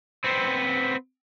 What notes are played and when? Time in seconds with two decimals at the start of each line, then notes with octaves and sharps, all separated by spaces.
0.24 B3 C4